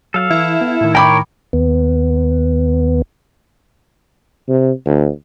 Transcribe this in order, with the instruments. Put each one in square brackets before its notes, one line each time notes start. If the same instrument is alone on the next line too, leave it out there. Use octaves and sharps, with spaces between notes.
[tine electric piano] F#3 [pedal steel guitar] A4 F5
[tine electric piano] E3 [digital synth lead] E4
[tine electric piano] B3
A2 D#3
[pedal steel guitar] A#4 C#5 [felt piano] G5 B5 D6
[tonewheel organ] D#2 B3
[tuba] C3
D2